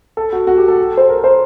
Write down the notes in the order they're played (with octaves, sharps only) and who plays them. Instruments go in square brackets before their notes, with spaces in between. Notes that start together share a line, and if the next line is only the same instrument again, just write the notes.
[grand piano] A4
F#4
F#4
G4
A4
C5
A#4
C5